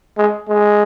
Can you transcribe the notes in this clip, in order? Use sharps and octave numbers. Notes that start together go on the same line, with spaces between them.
G#3
G#3